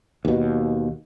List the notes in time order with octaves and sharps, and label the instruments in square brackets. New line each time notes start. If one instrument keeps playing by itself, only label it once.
[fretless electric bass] D#2 B2